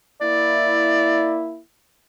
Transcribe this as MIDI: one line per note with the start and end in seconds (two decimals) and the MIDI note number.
0.21 1.60 58
0.21 1.60 64
0.21 1.42 74